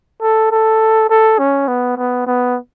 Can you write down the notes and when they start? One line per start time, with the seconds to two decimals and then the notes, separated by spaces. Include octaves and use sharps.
0.21 A4
0.51 A4
1.10 A4
1.39 C#4
1.68 B3
1.97 B3
2.27 B3